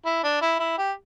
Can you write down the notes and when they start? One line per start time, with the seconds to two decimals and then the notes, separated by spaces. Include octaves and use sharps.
0.05 E4
0.24 D4
0.42 E4
0.59 E4
0.78 G4